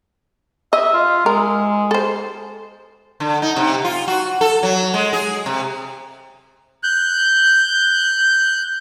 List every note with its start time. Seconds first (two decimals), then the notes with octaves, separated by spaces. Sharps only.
0.73 D#5 E5
0.94 F4
1.26 G#3 A#4
1.91 A4 C5
3.20 D3
3.42 D#4
3.56 C3
3.85 F4
4.08 F#4
4.41 A4
4.63 F#3
4.94 G#3
5.13 G#4
5.46 C3
6.83 F#6 G6